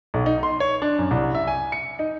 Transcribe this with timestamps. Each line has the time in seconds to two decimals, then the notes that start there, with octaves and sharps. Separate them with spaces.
0.14 B1
0.26 D#4
0.43 C6
0.60 C#5
0.82 D4
0.99 F#2
1.11 C2
1.35 E5
1.47 G#5
1.72 C#7
1.99 D#4